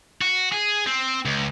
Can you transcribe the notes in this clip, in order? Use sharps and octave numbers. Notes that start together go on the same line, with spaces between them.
F#4
G#4
C4
C#2